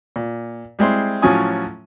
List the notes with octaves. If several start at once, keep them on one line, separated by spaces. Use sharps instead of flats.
A#2
G3 G#3 C4 E4 C6
A2 F3 F#3 C#4 G#5 D#6